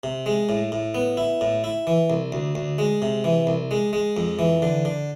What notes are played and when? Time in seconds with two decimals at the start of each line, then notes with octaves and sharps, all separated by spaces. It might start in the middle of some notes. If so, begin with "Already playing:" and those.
0.03 C3
0.26 G#3
0.49 A2
0.72 A2
0.95 B3
1.17 E4
1.41 A2
1.64 E4
1.87 E3
2.10 C2
2.32 D2
2.55 D2
2.78 G#3
3.02 C3
3.24 E3
3.47 C2
3.71 G#3
3.93 G#3
4.17 F2
4.39 E3
4.62 D3
4.85 D3